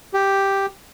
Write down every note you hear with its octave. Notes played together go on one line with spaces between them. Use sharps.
G4